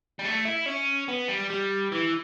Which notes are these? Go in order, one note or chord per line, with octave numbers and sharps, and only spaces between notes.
G3
A3
E4
C#4
B3
G3
G3
E3